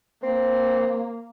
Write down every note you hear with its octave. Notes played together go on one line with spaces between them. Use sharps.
A#3 C4